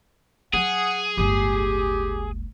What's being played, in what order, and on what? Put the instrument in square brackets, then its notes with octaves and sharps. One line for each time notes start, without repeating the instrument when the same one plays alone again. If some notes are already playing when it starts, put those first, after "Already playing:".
[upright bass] F#3 [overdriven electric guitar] G#4 [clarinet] F#5
[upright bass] D1 G1 [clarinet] G4